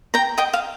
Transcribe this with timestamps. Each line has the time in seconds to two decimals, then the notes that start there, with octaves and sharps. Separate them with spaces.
0.14 G5 A#5
0.38 D#5 G5
0.53 F5